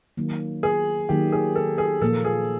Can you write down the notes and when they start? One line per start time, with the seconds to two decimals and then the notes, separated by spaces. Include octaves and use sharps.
0.17 D#3 F#3 A#3
0.63 G#4
1.09 D#3 F#3 A#3 G4
1.32 G#4
1.55 A4
1.78 G#4
2.02 A#2 F3 A#3 A4
2.25 G#4